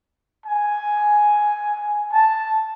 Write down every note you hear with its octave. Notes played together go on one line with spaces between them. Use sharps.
G#5
A5